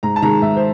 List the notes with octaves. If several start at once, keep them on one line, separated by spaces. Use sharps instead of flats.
G#2 A#5
A5
D#3 G#3 A#5
G#2 E5
C5